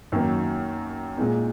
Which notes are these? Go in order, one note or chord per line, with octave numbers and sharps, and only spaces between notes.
F#2 D#3 F#3 A#3
A#2 G#3 D#4